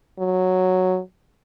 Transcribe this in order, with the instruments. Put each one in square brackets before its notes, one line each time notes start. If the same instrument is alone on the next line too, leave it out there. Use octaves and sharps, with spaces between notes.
[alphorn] F#3